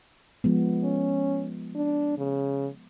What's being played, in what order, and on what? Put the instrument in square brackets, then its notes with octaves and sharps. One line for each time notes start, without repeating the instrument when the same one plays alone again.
[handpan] F3 G#3 B3
[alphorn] C#4
D4
C#3